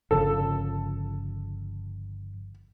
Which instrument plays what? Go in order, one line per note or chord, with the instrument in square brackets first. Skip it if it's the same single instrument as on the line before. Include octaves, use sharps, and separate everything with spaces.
[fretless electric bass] G1 C#3 F3 [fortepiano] A4